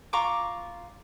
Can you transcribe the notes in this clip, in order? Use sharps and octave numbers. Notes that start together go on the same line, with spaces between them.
F4 A#5 C#6 D6